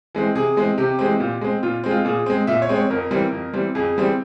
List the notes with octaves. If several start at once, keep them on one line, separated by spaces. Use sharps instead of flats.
E3 G#3 C4
C3 G#4
E3 G#3 C4
C3 G4
E3 G#3 C4
A#2
G#3 C4
A#2 F4
G#3 C4
F4
A#2 G#4
G#3 C4
A#2 E5
C#5
G#3 C4
C#5
F2 A#4
E3 G3 C4
F2
E3 G3 C4
F2 G#4
E3 G3 C4